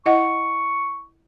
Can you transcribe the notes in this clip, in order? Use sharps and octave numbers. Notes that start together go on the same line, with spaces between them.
E4 D#5 F#5 C#6